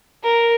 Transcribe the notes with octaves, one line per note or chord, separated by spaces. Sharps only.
A#4